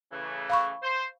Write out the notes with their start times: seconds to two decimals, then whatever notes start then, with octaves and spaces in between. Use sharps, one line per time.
0.12 C#3 E3 A3
0.50 F5 B5 C#6
0.83 C5